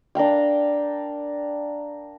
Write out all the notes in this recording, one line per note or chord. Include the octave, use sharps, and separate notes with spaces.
D4 A#4 F5 G5